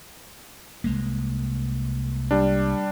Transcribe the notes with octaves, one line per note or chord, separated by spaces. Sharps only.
C2 G#3 A#3
G3 D4